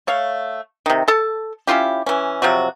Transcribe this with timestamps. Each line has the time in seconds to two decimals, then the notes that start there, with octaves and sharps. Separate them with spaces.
0.07 A3 C#5 F5
0.86 C3 D#3
1.08 A4 A5
1.67 C#4 E4 F4 G4
2.06 E3 C#4
2.42 C3 F3 F#3 F#4